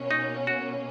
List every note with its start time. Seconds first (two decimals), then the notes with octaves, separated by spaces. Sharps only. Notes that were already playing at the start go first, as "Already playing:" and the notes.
Already playing: B2 A#3 C#4
0.11 D#4
0.47 F#4